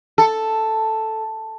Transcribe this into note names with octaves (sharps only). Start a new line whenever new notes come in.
A4